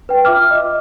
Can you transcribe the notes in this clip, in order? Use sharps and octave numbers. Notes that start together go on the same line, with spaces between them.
B4 G5
F4 E5 D6 F6
D#5